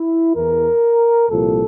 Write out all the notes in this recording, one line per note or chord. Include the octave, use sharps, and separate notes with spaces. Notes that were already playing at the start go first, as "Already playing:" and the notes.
Already playing: E4
E2 E3 A#4
C2 A#2 F3 A4